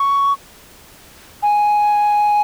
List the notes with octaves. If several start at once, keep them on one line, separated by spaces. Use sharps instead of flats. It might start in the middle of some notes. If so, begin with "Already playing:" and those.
Already playing: C#6
G#5